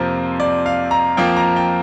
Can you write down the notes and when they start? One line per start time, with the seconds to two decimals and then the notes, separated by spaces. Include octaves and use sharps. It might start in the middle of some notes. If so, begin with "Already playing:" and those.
Already playing: F2 C3 F3 A#3 C5
0.40 D5
0.66 F5
0.91 A#5
1.17 F2 F3 A#3 G5
1.37 A#5
1.56 G5